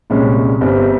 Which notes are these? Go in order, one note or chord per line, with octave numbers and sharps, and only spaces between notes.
C2 A#2 G#3 C#4
G1 G2 G3 C4